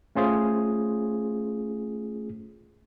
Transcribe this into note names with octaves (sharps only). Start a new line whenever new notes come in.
A3 C#4 F4 G#4 C5